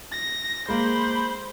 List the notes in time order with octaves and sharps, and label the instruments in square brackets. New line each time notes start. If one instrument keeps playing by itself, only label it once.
[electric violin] A#6
[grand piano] G#3 A#3 [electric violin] C5 [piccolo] B5